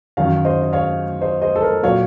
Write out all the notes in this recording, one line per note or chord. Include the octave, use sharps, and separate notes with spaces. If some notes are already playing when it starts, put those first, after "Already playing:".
F#2 D#3 F#3 C#5 F5
C5 D#5
D#5
C#5 F5
C5 D#5
C5 D#5
A4
A#4
A#2 F#3 C#5 F5